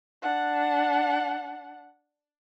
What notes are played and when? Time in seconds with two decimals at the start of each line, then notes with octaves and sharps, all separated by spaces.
0.22 D4 F#5